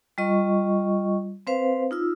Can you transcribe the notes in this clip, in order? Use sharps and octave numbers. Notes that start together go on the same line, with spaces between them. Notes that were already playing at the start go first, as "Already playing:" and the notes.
G3 F4 D#5 C#6
C4 B4 C5 F5
D#4 F4 E6